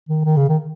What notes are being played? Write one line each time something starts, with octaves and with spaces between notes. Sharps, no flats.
D#3
D#3
C#3
D#3